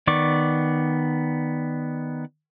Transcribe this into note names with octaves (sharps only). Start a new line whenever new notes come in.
D#3 B3 D5 C#6 D6